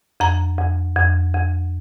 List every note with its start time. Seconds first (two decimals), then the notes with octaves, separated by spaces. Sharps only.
0.20 F2 A#5
0.59 F2
0.96 F2
1.34 F2